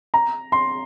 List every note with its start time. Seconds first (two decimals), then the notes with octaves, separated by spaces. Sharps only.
0.14 A#5
0.52 C6